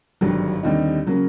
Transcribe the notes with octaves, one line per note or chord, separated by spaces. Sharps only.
G#1 G2 D3 F#3
D#2 D3 G3 C4 D#4
C#3 F#3 A#3